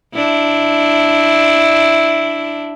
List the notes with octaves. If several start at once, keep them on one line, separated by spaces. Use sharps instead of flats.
D4 E4